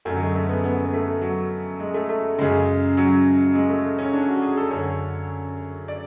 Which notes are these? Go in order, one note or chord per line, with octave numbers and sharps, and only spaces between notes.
F#2 D3 A3
F#3
G#3
A3
B3
B3
B3
A3
F#3
G#3
A3
A3
F#2 C#3 G#3
F#3
G#3
A3
C#4
D4
F#4
G#4
A4
F#2 D3 C#5
D5